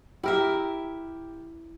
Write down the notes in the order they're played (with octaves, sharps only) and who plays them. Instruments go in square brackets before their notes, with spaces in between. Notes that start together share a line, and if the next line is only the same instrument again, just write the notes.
[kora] E4 A#4 E5 [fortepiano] G4